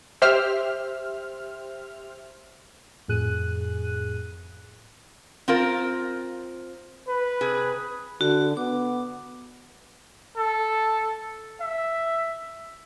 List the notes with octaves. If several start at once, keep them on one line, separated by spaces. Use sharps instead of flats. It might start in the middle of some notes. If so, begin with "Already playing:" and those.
G4 C5 E5 F6
F2 A2 G#4 F#6 D#7
C4 F4 A#4
B4
C3 G#4
D3 F#4
B3 D6
A4
E5